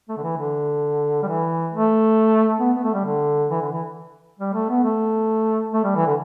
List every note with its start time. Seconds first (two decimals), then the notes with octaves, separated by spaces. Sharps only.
0.09 A3
0.17 D3
0.23 E3
0.37 D3
1.23 G3
1.27 E3
1.72 A3
2.60 B3
2.76 B3
2.83 A3
2.94 G3
3.05 D3
3.51 E3
3.61 D3
3.72 E3
4.39 G3
4.54 A3
4.69 B3
4.84 A3
5.73 A3
5.84 G3
5.96 E3
6.06 D3